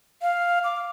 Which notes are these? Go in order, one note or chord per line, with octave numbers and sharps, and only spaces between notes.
F5
D6